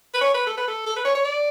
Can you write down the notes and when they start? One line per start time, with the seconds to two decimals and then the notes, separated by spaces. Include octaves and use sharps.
0.14 B4
0.21 C#5
0.34 B4
0.47 A4
0.58 B4
0.68 A4
0.86 A4
0.96 B4
1.05 C#5
1.15 C#5
1.25 D5